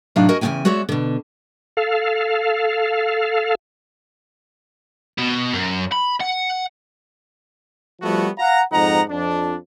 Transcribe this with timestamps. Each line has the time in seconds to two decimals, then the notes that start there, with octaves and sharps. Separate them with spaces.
0.16 A2 C3 F#3 D4 D#4 F5
0.29 F#4 A#4 D#5 G#5
0.41 E2 C#3 C4 D4 G5 G#5
0.65 G#3 F#4 C#5 D5 E5
0.89 B2 D3
1.77 A4 F5
5.18 B2
5.53 F#2
5.92 B5
6.20 F#5
8.02 F3 G3 A3 B3 F#4
8.39 F5 F#5 A#5
8.72 F2 G#2 D#4 F#5 A#5
9.10 F2 D4